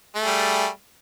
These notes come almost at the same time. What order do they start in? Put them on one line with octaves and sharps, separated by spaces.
A3 G#4 G3